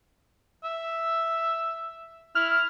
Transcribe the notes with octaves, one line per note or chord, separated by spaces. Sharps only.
E5
E4 F6